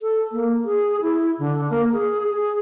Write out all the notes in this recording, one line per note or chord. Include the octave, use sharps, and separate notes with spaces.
A4
A#3
G#4
E4
D3
A#3
G#4
G#4